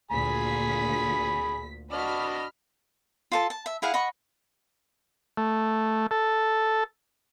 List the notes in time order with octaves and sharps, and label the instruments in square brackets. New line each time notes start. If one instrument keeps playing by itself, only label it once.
[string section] D2 A#2 B6 [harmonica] G#4 G#5 B5
[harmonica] D4 F#4 D#5 [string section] B5 F6
[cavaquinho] F4 A4 A5
A5
E5
E4 G#4 F5 F#5
D#5 F#5 B5 C#6
[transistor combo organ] A3
A4